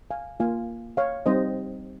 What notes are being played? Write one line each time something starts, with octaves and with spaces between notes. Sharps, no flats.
F5 G#5
A#3 F4 F5 G#5
C#5 F5
G3 C4 D#4 C5 D#5